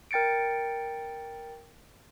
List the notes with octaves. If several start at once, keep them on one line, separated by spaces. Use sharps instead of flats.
A#4 G5 A6 C#7 D7